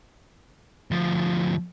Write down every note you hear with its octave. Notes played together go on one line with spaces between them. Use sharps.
D2 F3